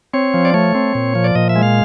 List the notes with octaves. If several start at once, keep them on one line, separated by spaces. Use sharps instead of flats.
C4 C#5
F3
D5
A3 C#5
C4
A#2
F3
D5
A#2 D#5
E5
G#3
F5